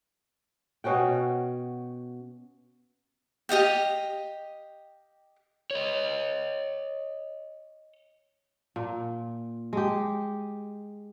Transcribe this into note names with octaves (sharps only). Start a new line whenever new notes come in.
B2 C#4 F#4 G5
G4 D#5 F5 G5
C#5 D#5
A#2
G#3 G4